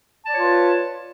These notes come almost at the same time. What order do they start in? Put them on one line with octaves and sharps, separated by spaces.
A5 D5 C#5 F4 B4